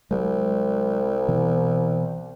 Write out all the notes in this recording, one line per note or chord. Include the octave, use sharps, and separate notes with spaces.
C2 F#3 G#3
B2 E3